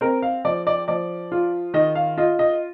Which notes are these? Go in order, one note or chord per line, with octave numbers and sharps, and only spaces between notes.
C4 A#4
F5
F3 D5
D5
F3 D5
F4
D#3 D#5
F5
F4 D#5
D#5